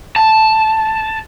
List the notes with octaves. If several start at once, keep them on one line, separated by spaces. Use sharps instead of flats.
A5